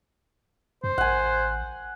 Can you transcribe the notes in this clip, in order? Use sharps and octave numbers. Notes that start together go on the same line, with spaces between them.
F#2 C5
A1 F#5 G#5